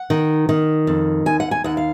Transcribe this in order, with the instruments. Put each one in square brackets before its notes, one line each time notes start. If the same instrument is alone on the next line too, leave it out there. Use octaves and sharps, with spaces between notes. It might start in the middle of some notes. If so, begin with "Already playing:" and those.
Already playing: [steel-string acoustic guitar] F#5
D#3
D#3
F2
D#2 G#5
F#5
G#5
D#2 F#5
F5